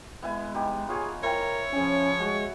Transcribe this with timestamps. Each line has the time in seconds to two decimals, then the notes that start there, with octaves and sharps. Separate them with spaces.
0.22 G#3 B3 E4 G#5
0.54 B3 D#4 G4
0.89 F4 G#4 C#5 G#5
1.23 E4 A#4 C5 C#5 G5
1.73 F3 C#4 G#4 G#5
2.20 G#3 F#4